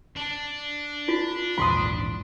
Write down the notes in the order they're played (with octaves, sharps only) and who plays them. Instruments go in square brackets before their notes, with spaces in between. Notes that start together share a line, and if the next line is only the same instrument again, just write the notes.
[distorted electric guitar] D4
[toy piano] E4 F4
[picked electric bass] A#1 E2 G#2 [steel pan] B5 C6 D#6